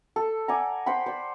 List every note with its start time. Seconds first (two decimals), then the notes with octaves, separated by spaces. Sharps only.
0.16 A4
0.48 D5 F#5 G#5 A#5
0.86 C5 F#5 G5 B5
1.06 C5 D5